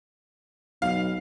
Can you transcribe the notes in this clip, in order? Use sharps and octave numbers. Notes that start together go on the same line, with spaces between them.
B1 F5